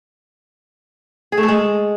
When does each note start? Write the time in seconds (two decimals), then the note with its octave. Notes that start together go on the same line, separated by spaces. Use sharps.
1.32 G#4
1.38 A3
1.43 A4
1.48 G#3